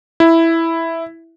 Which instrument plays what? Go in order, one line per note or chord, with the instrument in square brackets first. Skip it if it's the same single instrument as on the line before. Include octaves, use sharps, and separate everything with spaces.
[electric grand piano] E4